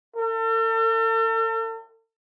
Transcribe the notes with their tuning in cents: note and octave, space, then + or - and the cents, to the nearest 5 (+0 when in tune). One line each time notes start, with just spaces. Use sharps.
A4 +40